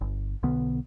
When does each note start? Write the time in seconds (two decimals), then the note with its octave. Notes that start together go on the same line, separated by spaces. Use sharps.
0.01 G1
0.43 B1 D3 B3